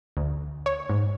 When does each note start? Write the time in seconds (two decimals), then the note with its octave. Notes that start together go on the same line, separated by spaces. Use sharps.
0.17 D2
0.66 C#5
0.90 G#2